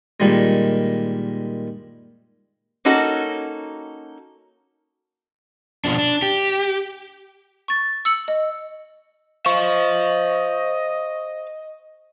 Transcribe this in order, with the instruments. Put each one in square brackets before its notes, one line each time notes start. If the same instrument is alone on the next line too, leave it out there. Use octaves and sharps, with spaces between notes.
[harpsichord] A#2 D#3 G3 G#3
[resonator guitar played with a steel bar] A#3 C#4 D#4 F#4 A4
[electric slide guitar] B2 F3 D4
D4
G4
[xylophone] C#6 A6
E6 C#7 F#7
D#5
[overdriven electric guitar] C5 F5 [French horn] D#5 [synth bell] C#6